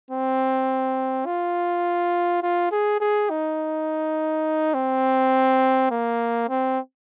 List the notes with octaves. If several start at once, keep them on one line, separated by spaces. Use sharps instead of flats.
C4
F4
F4
G#4
G#4
D#4
C4
A#3
C4